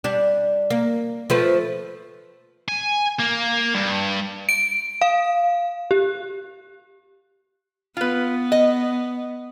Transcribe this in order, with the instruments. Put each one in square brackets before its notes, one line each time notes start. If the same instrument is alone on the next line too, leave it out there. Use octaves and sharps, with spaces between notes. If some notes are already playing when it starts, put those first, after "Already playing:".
[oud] G3 D4
A#3
F3 A3 B4
[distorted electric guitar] G#5
A#3
G2
[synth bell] D7
F5
G4
[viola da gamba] B3 [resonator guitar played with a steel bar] F4 B4
[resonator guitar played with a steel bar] D#5